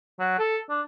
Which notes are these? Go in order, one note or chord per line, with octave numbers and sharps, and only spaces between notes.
F#3
A4
D4